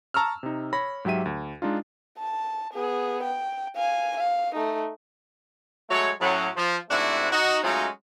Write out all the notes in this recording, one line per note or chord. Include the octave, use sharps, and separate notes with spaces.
A5 A#5 C#6 E6 F6
C3 D#4
C#5 B5 A#6
G#2 F#3 G4 E5 D#7
D2
G#3 D4 D#4 F4
A5
B3 G#4
G5
F5 G#5
F5
A3 D#4
F#3 G#3 A3 C#5
A2 F#3 C#4
F3
G#2 C3 A3 D4 E4 F#4
D#4 F#4
F#3 G#3 A3 C#4 D#4 F4